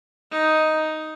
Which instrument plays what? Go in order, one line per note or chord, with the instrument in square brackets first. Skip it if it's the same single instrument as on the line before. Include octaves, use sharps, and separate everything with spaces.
[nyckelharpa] D#4